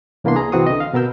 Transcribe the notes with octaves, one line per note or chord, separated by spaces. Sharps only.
C2 E3 A#3 B3 D4 C6
G#4 A#5
C2 E3 C4 F#4 C#6 D#6
D3 D#5
F5
B2 B3 A#4 E6 G6